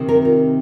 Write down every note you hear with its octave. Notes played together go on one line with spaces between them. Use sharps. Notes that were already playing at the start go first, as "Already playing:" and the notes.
Already playing: C3 D#3 C4 D#4
A#4
F4